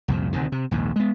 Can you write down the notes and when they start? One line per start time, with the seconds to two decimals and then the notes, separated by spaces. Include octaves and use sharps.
0.08 C2 F2 A#2
0.33 D2 C3 D#3
0.52 C3
0.71 A#1 D#2 G#2
0.96 G#3 B3